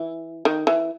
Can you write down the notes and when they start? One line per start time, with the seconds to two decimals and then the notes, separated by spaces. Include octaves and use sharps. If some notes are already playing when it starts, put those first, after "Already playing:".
Already playing: E3
0.45 D#3
0.67 E3